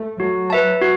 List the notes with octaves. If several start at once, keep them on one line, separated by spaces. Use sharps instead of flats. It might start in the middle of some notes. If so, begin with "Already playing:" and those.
Already playing: A3
F#3 F#4
B4 E5 A5
F#4